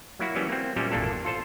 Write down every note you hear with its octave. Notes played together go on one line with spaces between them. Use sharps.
F#3 A#3 E4 F#4
E3 F#3 G3 B3 C#4
A#3 C4
A#2 F#3 G3 C#4 E5
G#1 E2 A#2 A#3 D4 A4
F4 A4 C5 A5